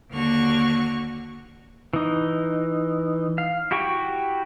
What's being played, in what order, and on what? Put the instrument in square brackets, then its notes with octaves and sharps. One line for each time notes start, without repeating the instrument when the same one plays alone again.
[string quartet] D#2 D3 F#4 C#6 F6
[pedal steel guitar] E3 D#4
F5
E4 F#4 G4 G5 C#6